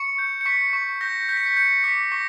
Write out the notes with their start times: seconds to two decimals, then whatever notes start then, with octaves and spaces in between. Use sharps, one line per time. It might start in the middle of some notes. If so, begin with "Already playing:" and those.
Already playing: C#6 C#7
0.18 G6
0.41 C#7
0.46 C#6 B6
0.73 C#6
1.01 G6 A#6
1.29 G6 B6
1.37 C#7
1.46 B6
1.56 G6 C#7
1.84 D6 B6
2.12 C#6 A#6